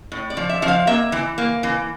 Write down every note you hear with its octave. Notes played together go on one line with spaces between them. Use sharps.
A2
D5
F3
E5
F3 E5
F5
A#3 E5
E3
A#3
E3